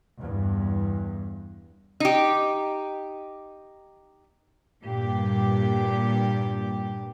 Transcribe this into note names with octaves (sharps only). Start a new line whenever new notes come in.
E2 G2
D#4 G4
G2 A#2 G4